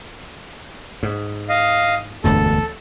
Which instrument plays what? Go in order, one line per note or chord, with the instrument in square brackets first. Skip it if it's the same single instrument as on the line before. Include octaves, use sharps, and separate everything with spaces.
[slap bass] G#2
[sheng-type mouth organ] D#5 F5
[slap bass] E1 D2 G2 [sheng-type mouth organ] A4